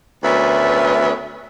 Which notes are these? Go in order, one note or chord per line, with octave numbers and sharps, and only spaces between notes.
D2 B3 C#4 A#4 B4 E5